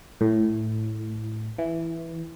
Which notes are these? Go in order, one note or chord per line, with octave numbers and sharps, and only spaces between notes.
A2
E3